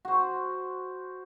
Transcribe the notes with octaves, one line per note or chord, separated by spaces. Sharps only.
F#4 C5